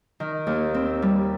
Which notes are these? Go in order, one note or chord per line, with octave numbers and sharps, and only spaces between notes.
D#3
D#2
C4
G3